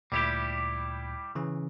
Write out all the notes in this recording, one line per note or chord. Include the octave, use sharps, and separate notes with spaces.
D2 A#2 G3 E4 G4
C#3 E3 C#4